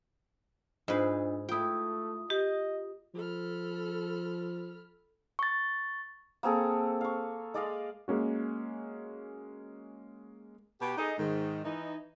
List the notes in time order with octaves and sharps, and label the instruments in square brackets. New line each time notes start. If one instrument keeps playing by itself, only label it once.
[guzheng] G#2 G#4 B4 [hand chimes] D4 F4 D#5
[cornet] A3 [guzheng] E4 G5 [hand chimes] F4 D#6
[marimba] G4 [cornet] D#5
[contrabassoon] F3 [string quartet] A4 B5 F6
[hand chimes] C#6 A6
[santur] A#3 C4 G#4 A4
F5 C#6
G#3 D5 D#5 F5
[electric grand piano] G#3 A#3 C#4 F#4
[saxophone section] B2 F#4 G4
D#4 G#4 A4 D#5
G#2 D#3
E3 D#4